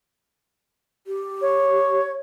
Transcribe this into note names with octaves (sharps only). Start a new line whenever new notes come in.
G4
C#5